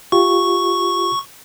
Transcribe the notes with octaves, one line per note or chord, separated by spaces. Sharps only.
F4 G4 C#6